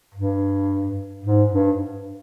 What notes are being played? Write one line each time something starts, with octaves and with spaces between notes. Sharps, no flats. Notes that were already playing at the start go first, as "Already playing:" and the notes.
G2
G#2
G2